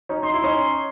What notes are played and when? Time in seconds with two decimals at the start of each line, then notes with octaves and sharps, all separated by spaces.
0.09 C#4 D#4
0.23 D#4 C6
0.33 E4
0.44 C#4 D#4